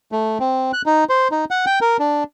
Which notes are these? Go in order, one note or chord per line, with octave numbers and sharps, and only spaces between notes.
A3
C4
F#6
D#4
C5
D#4
F#5
G5
A#4
D4